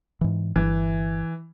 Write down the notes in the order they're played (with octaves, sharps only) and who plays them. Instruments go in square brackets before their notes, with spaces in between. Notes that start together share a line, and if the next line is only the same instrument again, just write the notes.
[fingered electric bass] G#2 E3
[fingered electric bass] G1 [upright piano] E3